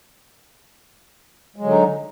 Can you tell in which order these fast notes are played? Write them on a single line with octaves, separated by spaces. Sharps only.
G#3 F#3 D3 D#4